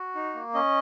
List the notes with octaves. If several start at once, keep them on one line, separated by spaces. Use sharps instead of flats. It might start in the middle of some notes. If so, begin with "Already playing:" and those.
Already playing: F#4
D#4
A#3
C#4 D#5